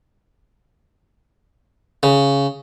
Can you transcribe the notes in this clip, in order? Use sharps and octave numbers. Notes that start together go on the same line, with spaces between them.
C#3